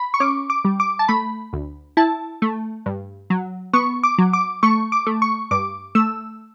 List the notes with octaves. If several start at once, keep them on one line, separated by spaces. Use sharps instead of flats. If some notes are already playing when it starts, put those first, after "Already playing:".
Already playing: B5
C#6
C#4 D6
D6
G3
D6
A5
A3 B5
D2
E4 A5
A3
G2
F#3
B3 C#6
D6
F#3
D6
A3 C#6
D6
A3
C#6
G2 D6
A3 E6